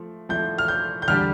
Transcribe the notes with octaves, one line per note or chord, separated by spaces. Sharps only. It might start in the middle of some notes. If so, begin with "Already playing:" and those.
Already playing: F3 A3
F3 A3 E4 G6
F6
G6
G6
E2 D3 G3 D4 G4 F6